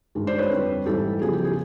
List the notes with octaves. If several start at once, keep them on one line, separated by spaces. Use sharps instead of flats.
G2 D#3 G#3
C5 D5
B4 C#5
F2 D3 G3
G#2 E3 G3 G4 A4
E2 C#3 F3 G#4
G4
G#4